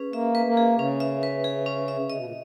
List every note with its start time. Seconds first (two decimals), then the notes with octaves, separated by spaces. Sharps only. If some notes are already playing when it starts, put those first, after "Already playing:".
Already playing: C#4 G#4 B4
0.13 A#3 E5
0.35 B4
0.46 A#3
0.57 G#4
0.78 C#3 C#4
1.00 E5
1.23 B4
1.44 G#4
1.66 C#4
1.88 E5
2.10 C#3 D#5
2.18 B2
2.25 A#2